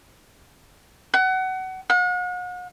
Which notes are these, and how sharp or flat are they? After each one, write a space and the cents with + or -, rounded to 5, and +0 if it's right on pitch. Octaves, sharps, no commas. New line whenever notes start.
F#5 +25
F#5 -40